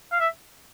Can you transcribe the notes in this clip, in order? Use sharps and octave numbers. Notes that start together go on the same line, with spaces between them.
F5
E5